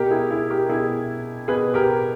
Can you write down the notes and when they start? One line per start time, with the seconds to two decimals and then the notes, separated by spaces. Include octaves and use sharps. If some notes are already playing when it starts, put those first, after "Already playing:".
Already playing: B2 G4 A#4
0.11 E4 G#4
0.31 E4 G#4
0.50 G4 A#4
0.69 B2 E4 G#4
1.48 B2 G#4 B4
1.74 G4 A#4